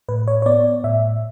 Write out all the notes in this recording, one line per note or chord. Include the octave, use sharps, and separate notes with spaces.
A2 B4
C#5
C#5
B3 D5
A2 E5